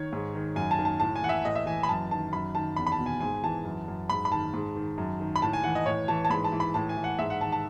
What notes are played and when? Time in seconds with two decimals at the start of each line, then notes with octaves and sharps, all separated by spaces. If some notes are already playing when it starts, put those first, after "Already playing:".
Already playing: D#3 C#5
0.12 G#2
0.35 D#3
0.56 F#2 G#5
0.71 A5
0.79 D#3
0.85 A5
1.00 A2 A5
1.16 G#5
1.22 E3 F#5
1.29 E5
1.45 A2 D#5
1.55 E5
1.66 E3 G#5
1.83 B5
1.89 F#2 A5
2.11 D#3 A5
2.33 F#2 B5
2.55 D#3 A5
2.76 E2 B5
2.87 B5
2.92 A5
2.99 B2
3.06 G#5
3.20 G#2 G#5
3.43 E3 A5
3.65 F#2
3.88 F#2
4.09 G#2 B5
4.25 B5
4.32 D#3 A5
4.53 G#2
4.76 D#3
4.98 F#2
5.20 D#3
5.36 B5
5.42 A2 A5
5.53 G#5
5.63 E3 F#5
5.75 D#5
5.86 A2 C#5
6.08 E3 A5
6.25 A5
6.30 G#2 B5
6.44 A5
6.52 E3
6.60 B5
6.74 A2 A5
6.89 G#5
6.97 E3
7.04 F#5
7.18 G#2 E5
7.30 F#5
7.41 D#3 A5
7.52 A5